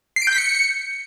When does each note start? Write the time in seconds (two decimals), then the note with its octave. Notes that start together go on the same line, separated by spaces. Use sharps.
0.16 C7
0.22 D7
0.27 G6
0.33 B6
0.38 C#7